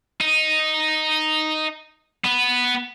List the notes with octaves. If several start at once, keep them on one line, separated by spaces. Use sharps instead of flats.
D#4
B3